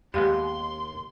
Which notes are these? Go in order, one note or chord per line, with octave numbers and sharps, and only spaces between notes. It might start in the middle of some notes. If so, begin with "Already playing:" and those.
D#2 G3 G#3 B3 G4 F5 C6